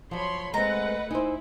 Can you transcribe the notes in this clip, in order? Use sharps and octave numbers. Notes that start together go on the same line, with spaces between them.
F3 F#3 C#5 B5 C6
G#3 A3 C4 B4 D#5 F#5 A#5
D#4 E4 C5 G#5